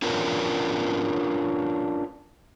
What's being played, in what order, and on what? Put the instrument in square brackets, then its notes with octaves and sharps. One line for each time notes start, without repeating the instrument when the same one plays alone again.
[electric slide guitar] C#4 D4 F4 A#4 B4